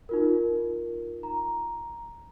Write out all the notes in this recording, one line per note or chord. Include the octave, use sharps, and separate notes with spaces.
D#4 F4 A#4
A#5